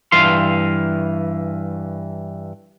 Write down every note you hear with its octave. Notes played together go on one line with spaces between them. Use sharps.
G2 E3 F5 C6